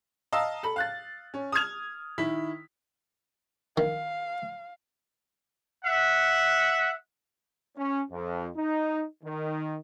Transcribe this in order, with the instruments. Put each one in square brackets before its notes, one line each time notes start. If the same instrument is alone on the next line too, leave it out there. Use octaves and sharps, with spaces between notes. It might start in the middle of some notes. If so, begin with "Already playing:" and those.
[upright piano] D#5 F5 A5 A#5 E6
A4 B5
F5 F#6 A6
C#4
D#6 F6 G#6 F7
D#3 E4 B6
[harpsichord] D#3 [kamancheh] F5
[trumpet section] E5 F#5
[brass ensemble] C#4
F2
D#4
D#3